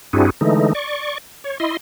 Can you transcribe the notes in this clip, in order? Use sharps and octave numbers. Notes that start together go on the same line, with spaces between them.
G2 C4 D4 E4 F#4 G#4
D3 E3 G#3 A3 D#4
D5 C#6
C#5
E4 D#5 C6